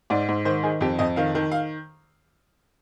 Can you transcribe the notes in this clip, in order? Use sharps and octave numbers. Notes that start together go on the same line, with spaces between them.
G#2 D5
G#2
D#3 C5
D#3 G#4
F2 G4
F2 D#5
D#3 F5
D#3
F5